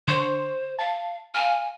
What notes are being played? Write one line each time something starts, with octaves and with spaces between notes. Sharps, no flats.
D3 C5 C6 C#6
F5 A5
F5 G#5